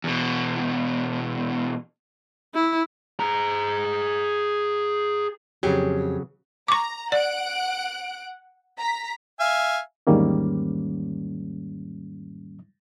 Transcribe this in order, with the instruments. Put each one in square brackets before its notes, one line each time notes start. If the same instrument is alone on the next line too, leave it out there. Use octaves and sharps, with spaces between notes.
[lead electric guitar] E2 B2
[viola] E4
[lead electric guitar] G#4 A#5
[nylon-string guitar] F2 G4 G#4 [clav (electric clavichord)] C#3 F#3
[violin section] A#5 [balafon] C#6 D6
[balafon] D5 [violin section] F#5 F#6 D7
[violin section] A#5 B6
[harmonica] E5 F5 G#5
[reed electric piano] E2 G#2 D#3 G3 A#3 C#4